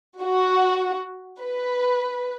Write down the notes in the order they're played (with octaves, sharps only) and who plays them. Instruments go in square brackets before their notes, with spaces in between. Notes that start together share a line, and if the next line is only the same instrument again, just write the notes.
[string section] F#4
B4